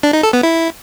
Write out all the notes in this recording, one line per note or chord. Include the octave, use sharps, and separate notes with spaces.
D4
D#4
A4
B3
E4